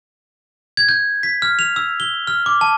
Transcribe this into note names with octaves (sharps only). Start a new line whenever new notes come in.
G#6
G6
B6
F6
F7
E6
G7
F6
D6
A5